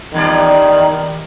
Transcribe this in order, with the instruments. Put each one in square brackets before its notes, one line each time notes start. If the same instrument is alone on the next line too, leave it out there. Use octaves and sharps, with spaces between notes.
[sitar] D#2 G3 D5 [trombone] D#3